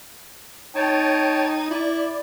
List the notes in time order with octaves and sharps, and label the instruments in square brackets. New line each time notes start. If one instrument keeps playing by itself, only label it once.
[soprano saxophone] D#4 [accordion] C#5 G5 A5
[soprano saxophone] E4 [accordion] D5